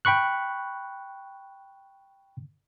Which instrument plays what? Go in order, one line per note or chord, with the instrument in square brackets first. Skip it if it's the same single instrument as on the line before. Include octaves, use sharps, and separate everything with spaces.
[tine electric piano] G5 B5 C#6 F#6